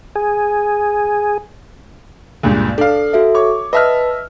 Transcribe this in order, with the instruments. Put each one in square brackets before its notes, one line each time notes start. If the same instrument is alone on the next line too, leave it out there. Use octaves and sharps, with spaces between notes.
[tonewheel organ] G#4
[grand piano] C#2 G2 A#2
[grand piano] D4 F5 [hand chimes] A4
[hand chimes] F#4 A4 E5
[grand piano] C#5 C#6 [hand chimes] D6
[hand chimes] B4 A5 [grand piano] D#5 E5 F6